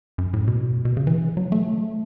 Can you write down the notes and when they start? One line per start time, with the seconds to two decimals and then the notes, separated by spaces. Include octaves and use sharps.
0.18 F#2
0.34 A2
0.48 B2
0.85 B2
0.97 C#3
1.07 E3
1.37 F#3
1.52 A3